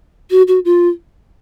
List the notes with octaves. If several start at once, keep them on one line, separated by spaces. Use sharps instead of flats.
F#4
F#4
F4